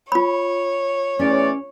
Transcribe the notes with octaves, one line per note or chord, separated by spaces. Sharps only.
F4 C#5 B5
E2 A3 C#4 D5